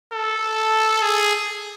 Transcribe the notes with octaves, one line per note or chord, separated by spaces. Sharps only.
A4
G#4